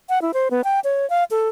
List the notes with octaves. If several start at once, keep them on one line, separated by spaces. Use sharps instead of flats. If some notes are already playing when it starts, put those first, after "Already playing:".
F#5
E4
C5
B3
G5
C#5
F5
A4